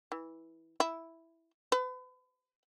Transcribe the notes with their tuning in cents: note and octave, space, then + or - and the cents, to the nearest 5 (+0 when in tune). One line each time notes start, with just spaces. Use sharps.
E3 -15
E4 +0
B4 +40